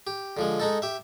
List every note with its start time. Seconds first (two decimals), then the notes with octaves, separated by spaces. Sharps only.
0.07 G4
0.37 D3 F3 G#3
0.60 G#3 D#4 A4
0.82 G4 E5